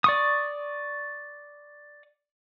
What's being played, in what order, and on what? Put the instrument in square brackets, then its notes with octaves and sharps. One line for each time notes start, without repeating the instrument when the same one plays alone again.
[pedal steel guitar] D5 C#6 D#6